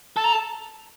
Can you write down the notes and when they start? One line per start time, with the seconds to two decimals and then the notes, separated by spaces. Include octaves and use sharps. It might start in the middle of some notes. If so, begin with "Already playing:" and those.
0.16 A4 A5
0.24 A#5
0.33 A5